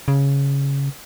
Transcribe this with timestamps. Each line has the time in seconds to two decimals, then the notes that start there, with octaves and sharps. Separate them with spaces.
0.08 C#3